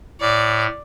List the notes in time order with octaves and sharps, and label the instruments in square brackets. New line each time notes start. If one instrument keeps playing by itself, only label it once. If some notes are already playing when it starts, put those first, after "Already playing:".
[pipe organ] A2 [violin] D5